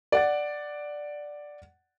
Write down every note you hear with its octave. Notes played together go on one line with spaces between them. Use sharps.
D5 F#5 A6